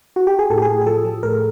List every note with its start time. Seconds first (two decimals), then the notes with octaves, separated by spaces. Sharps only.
0.16 F#4
0.27 G4
0.39 G#4
0.50 A2 A4
0.57 G4
0.62 G#4
0.68 A2
0.81 G#4
0.86 F3 A4
1.05 F3
1.23 A2 A#4